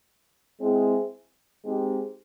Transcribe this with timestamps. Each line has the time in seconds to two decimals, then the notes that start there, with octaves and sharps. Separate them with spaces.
0.60 G#3 C4 E4 G#4
1.64 G#3 C4 D#4 G4